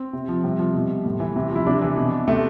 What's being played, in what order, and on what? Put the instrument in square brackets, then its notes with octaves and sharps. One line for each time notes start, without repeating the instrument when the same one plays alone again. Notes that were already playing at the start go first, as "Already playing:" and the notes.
Already playing: [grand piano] C4
C3
F3
C3 G3
F3
B2
A2
E3
C3
F3 E4
C3 D4
E3
B2
C3 A3